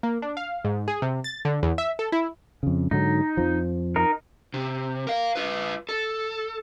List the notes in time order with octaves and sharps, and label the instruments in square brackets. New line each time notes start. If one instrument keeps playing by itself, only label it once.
[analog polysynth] A#3
D4
F5
G#2
G#4
C3
A6
D3
E2
E5
A4
E4
[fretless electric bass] F2 C#3
[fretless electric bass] G#2 D3 F#3 [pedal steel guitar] D#4
[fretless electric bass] F2 F3
[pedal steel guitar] D#4 A#4
[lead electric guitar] C3
A#4 F5
F4 B4
A4